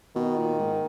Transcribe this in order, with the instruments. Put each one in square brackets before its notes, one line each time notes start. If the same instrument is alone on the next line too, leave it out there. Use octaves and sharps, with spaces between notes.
[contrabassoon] B2 [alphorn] D#3
[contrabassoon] A#2
G#2